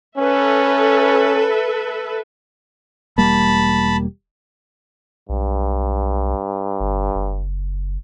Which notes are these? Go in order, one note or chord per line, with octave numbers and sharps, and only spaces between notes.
C#4 A4 B4 E5
E1 G3 A#3 A5 B5
B1 G2
G1
F#1